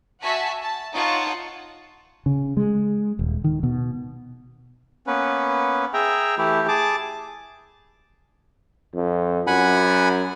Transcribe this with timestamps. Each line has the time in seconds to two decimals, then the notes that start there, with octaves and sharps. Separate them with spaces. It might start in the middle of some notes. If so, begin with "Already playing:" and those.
0.22 F#4 E5 F#5 G#5 A5 B6
0.61 A5
0.93 D#4 F4 C#5 F#5 A5 C#6
2.26 C#3
2.57 G#3
3.19 D#1
3.44 D#3
3.63 B2
5.07 A#3 B3 C#4 B4
5.94 G#4 E5 G5 A#5
6.38 E3 A3 E4 G4
6.68 G#4 A5 D6
8.95 F2
9.47 F#2 F#5 G#5 B5